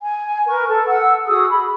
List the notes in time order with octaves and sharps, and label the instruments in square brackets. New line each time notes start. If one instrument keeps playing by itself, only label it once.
[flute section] G#5
A#4 B4 C#6
A4
F#5 E6
F#4 G#4 D#6 E6
B5